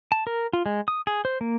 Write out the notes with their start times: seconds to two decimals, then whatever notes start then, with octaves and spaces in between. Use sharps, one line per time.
0.12 A5
0.27 A#4
0.53 F4
0.66 G#3
0.88 D#6
1.07 G#4
1.25 C5
1.41 A#3